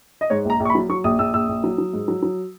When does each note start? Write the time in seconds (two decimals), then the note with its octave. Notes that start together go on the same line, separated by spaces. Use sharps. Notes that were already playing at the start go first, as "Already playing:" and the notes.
0.21 D#5
0.30 G#2 C#5
0.45 A#1 A#5
0.60 A#1
0.65 C#6
0.70 B5
0.75 F#3
0.89 F#3 C#6
1.04 A#1 D#6
1.19 A#1 E6
1.34 A#1 E6
1.49 A#1
1.64 F#3
1.78 F#3
1.93 G#2
2.08 F#3
2.22 F#3